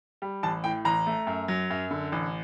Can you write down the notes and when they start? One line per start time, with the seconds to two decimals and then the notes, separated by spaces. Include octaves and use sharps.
0.22 G3
0.43 A1 A5
0.64 A2 G5
0.85 A1 A#5
1.07 A3
1.27 F#2
1.48 F#3
1.70 F#2
1.91 D3
2.12 A1